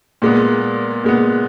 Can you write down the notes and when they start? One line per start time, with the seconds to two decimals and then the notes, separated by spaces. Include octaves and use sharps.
0.22 A#2 G#3 B3
1.04 A#2 G#3 B3